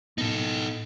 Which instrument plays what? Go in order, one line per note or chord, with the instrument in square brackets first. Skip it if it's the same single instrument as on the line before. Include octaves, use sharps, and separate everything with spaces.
[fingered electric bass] A2 B3 [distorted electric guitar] D#4 A4